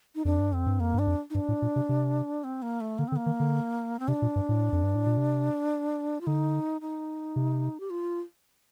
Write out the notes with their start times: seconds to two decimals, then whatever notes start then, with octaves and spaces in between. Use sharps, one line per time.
0.15 D#4
0.25 F2 D4
0.39 G2
0.52 F2 C4
0.66 G2
0.79 F2 A#3
0.94 G2 D4
1.07 F2
1.30 D#4
1.35 G2 D4
1.49 A2
1.62 A#2
1.76 C3
1.89 C3
2.44 C4
2.62 A#3
2.81 A3
2.98 D3 A#3
3.08 C4
3.12 D3
3.16 A#3
3.26 D#3
3.40 D3
3.99 C4
4.08 C3 D4
4.22 A#2
4.36 G2
4.49 A2
4.73 F2
4.83 G2
4.95 A2
5.06 A#2
5.17 C3
6.21 F4
6.27 D3 D#4
6.81 D#4
7.36 C3
7.80 G4
7.90 F4